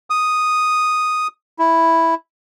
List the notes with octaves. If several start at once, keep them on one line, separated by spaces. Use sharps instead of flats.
D#6
E4